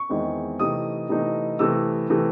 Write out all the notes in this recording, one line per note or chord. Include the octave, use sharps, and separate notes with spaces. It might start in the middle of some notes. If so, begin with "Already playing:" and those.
Already playing: C#6
E2 D#3 G#3 C4 E4
C3 E3 A3 D#4 D#6
C3 E3 A3 D#4
C3 E3 A3 E6
C3 E3 A3